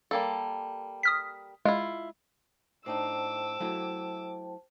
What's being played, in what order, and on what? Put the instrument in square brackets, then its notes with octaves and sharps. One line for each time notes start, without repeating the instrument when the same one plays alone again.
[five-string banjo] G3 A#3 A4
[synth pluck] D#6 F6 B6
[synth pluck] G#3 [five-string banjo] E4 F4
[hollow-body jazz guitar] A2 D4 D#4 [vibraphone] C5 G5 A5 [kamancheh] D6 E6
[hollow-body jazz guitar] F#3 A3 E4